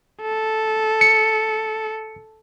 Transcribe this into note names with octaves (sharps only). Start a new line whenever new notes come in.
A4
C#7